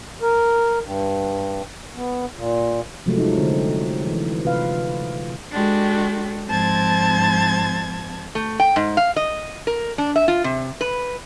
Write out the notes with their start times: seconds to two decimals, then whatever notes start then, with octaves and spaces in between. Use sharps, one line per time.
0.22 A#4
0.84 G2
1.96 B3
2.35 A#2
3.06 C3 F3 F#3 G#3 A3
3.18 G#3 D#4
3.38 D3 C4
4.07 E3
4.44 C3 F4 B4 F5
5.53 G#3 D4 F#4 G4 A4
6.48 G#2 F3 C4 A5 G#6 A6
8.35 A3
8.60 G5
8.76 G#2
8.97 F5
9.16 D#5
9.67 A#4
9.98 D4
10.16 E5
10.28 F4
10.44 C3
10.81 B4